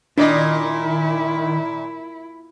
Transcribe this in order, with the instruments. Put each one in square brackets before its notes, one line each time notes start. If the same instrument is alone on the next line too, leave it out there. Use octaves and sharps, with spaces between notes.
[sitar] A#2 [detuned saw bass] D#3 [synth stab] D4 D5 D#5 [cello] E4